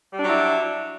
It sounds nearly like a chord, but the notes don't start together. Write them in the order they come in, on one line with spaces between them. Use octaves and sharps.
G3 D4 F#3 E4